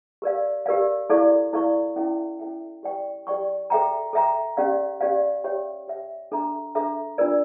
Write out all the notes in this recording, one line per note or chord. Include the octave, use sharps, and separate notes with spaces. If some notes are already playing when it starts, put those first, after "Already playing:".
G4 A#4 D5 F5
G4 A#4 D5 F5
E4 A4 D5 F5 C#6
E4 A4 D5 F5 C#6
C#4 E4 A4 E5 G5
C#4 E4 A4 E5 G5
G4 D5 G5 C#6
G4 D5 G5 C#6
A4 E5 G5 A#5
A4 E5 G5 A#5
C#4 G4 D5 F5
C#4 G4 D5 F5
G4 C#5 E5 G5
G4 C#5 E5 G5
D4 A4 E5 A#5
D4 A4 E5 A#5
D4 F4 A#4 D5